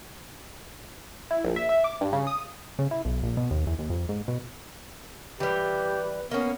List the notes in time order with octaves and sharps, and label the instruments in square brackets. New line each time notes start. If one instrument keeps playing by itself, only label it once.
[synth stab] E4
A#1
E5
E5
D6
G2
C#3
D#6
[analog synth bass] C#3
E4
B1
A#1
B2
D#2
E2
D#2
F2
G#2
B2
[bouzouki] E3 G3 [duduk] G4 [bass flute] B4
[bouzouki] A#3 C#4 [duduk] B3